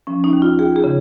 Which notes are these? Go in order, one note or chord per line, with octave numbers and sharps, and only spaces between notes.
F3 C#4
D#4
D#2
F4
D#2 G#4
G#4
C#3